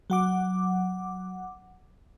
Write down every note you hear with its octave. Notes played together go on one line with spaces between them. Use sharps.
F#3 F#5 D6